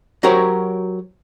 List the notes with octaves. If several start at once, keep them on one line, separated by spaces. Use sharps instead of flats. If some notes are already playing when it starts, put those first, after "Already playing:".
F#3 F#4 G4 A#4 C5 C#5